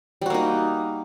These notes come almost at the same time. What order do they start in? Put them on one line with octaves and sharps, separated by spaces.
G3 F#4 A#3 D#4